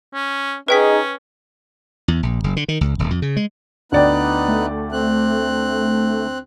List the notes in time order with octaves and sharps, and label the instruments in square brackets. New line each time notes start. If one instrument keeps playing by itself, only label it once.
[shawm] C#4
[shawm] C#4 [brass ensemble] D#4 G#4 [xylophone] B4 G5 B6
[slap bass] E2
A#1
F#1
D3
D#3
C#2
D#1
F2
C#3
G#3
[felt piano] D2 D5 G5 [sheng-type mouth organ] B3 D#4 F#6
[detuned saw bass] A3
[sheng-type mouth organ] C4 F#6